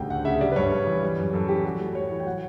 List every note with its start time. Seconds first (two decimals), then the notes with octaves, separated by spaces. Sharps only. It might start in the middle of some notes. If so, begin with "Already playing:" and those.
Already playing: D2 C#3 G3 G5
0.10 D2 F#5
0.25 C#3 E5
0.41 G3 D5
0.52 B4
0.56 G2 C#5
0.72 G2
0.87 E3
1.03 G3
1.18 F#2
1.33 F#2 A4
1.48 E3 G4
1.64 G3 F#4
1.80 A2
1.95 A2 C#5
2.11 E3
2.20 G5
2.26 F#3 F#5